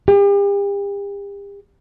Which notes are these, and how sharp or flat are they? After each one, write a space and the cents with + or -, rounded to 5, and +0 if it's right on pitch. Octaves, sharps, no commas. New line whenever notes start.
G4 +40